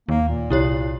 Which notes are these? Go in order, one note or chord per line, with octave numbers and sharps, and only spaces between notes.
D#2 A#3
A#2
C2 E4 G4 C#5